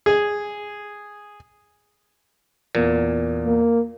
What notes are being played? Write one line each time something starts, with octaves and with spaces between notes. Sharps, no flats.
G#4
E2 A#2
A#3